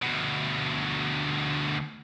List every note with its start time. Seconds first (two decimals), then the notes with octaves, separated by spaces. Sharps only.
0.02 D2 B2